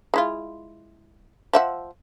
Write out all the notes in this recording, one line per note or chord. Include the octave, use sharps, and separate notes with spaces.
G#3 E4 F4
F3 E5 F#5